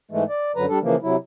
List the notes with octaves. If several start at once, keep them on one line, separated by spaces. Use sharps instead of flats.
G#2 E3 G#3 A3
D5
F#2 D3 F#3 B4 A#5
G3 D4 A4
C#3 E3 F3 A#3
C3 F#3 E4